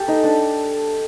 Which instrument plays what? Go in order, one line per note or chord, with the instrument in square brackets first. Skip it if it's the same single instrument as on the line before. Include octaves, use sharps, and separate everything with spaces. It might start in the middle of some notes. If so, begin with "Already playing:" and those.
Already playing: [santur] G4 A4
D#4
D4